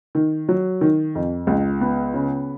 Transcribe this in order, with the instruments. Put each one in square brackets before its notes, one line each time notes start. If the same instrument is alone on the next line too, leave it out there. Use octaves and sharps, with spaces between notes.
[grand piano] D#3
F#3
D#3
F2
C#2
B3
C#3